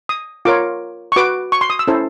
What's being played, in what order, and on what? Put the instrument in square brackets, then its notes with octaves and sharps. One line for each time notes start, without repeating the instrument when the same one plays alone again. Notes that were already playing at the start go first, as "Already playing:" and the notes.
[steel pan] D#6
F4 A#4 C#5 D6
C#6
F#4 B4 D6
C#6
C6
D#6
E6
C#4 E4 A4 C5